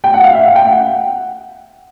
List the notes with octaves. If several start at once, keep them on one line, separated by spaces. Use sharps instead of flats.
G5
F#5
F5
E5
F5
G5
F#5